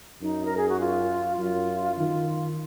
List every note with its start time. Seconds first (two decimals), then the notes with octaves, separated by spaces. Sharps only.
0.22 F#2 D#4
0.45 A#4
0.57 G#4
0.69 F#4
0.80 F4
1.39 F#2 F4
1.98 D#3 F4